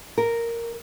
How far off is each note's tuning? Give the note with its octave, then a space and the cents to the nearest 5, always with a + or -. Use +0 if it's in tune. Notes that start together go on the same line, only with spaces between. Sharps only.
A#4 -5